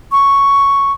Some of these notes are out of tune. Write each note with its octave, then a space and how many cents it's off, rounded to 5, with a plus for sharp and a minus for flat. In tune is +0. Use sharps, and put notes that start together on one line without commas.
C#6 +0